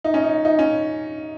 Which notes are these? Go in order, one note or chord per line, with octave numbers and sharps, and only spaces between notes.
D#4
C#4
D#4
D#4
C#4